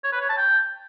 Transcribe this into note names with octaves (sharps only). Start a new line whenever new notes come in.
C#5
B4
C#5
A5
G5